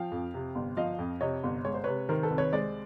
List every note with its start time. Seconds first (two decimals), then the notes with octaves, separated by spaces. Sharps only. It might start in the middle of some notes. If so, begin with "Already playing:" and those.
Already playing: F3 F5 G5
0.12 F2
0.34 C3
0.55 G1
0.77 F3 D#5 F5
0.99 F2
1.21 C3 C#5 D#5
1.43 G1
1.65 G#3 C#5
1.74 C5
1.84 C3 B4 C#5
2.09 D#3 A#4 C5
2.23 A4 B4
2.30 C2
2.38 B4 C#5
2.52 G#3 C5 D5